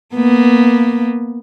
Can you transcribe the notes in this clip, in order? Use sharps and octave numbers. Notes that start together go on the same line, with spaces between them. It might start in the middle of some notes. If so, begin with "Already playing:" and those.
A#3 B3